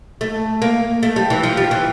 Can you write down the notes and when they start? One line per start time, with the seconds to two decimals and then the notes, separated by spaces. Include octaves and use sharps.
0.21 A3
0.62 A#3
1.03 A3
1.16 G3
1.30 E3
1.43 F3
1.57 G3
1.71 E3